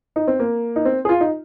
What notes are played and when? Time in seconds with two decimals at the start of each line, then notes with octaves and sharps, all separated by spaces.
0.16 D#4
0.28 C4
0.39 A#3
0.76 D#4
0.85 C4
1.05 G#4
1.09 F4
1.21 D#4